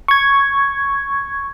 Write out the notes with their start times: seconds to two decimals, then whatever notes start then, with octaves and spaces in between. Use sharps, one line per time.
0.08 C#6 G#6